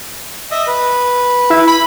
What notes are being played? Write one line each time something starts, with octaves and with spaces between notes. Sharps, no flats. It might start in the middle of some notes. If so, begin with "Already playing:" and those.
D#5 E5
B4
E4
B5